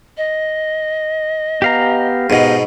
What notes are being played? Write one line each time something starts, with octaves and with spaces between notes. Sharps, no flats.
D#5
B3 G4 F5 A#5
G#2 B2 B3 D#5